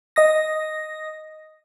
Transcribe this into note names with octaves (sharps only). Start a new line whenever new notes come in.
D#5 D#6 A#6